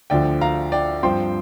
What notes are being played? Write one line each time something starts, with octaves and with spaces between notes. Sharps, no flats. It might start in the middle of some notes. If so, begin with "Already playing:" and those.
D2 D3 F3 D5 G5
F5 A#5
D5 G5
G2 F3 C4 G5 C6